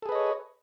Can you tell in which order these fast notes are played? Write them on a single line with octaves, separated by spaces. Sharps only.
A4 G#4 B4 D#5 C#5